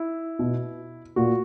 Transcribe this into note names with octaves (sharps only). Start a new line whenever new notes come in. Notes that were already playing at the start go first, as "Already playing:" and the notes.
Already playing: E4
B2
A#2 F#4